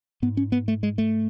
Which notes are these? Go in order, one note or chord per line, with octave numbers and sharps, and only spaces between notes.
G#2 B3
C#4
B3
A3
G#3
A3